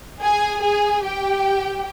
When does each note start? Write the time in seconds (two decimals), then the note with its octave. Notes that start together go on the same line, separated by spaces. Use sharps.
0.22 G#4 G#5
0.63 G#4 G#5
1.04 G4 G5